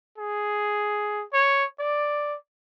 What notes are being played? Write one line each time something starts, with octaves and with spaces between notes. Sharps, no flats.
G#4
C#5
D5